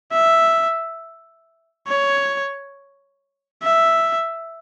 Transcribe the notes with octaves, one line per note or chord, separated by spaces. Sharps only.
E5
C#5
E5